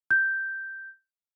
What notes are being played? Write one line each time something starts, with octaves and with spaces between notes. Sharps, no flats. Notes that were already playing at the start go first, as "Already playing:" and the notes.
G6